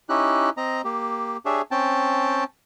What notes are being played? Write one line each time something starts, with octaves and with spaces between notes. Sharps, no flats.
C#4 D#4 E4 G4 F#6
C4 D#5 A#5
A#3 G4
D4 G4 G#4 C#5 E5
C4 C#4 G5 A5